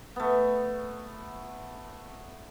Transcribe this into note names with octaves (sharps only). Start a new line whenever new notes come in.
A3 B3